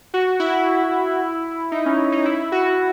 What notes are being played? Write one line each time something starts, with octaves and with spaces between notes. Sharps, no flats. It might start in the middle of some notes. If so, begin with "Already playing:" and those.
F#4
E4
D#4
C#4
D#4
E4
F#4